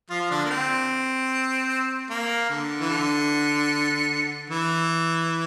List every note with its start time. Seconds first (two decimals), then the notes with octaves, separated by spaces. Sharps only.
0.10 F3 F4
0.30 D3 D4
0.45 A#3
0.50 C4
2.10 A#3
2.50 D3
2.80 E3
2.90 D3
4.50 E3